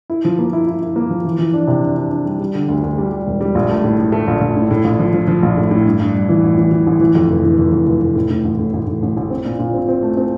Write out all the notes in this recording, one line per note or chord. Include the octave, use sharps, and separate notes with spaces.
E4
F3
A#3
E4
E4
E4
A#3
F3
E3
E3
D4
C3
D4
D4
D4
G3
G3
D3
D2
D2
G3
G3
E1
G3
A#1
A3
A2
A2
A3
A#1
A#1
A2
A2
A#1
F3
F3
F3
A#1
A2
A2
G2
G2
G2
E3
A1
E3
E3
A1
E3
F2
F1
E3
F1
F2
F1
F1
A2
A2
A1
A2
A1
A1
A1
A1
C4
A#2
A#2
C4
C4
A3
C4